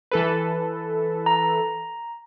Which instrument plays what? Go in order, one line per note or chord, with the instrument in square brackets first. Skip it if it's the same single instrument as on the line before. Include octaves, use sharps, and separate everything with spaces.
[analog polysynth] E3 A4 B4
[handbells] A#5